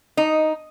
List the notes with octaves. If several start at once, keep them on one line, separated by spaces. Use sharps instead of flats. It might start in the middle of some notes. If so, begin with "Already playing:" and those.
D#4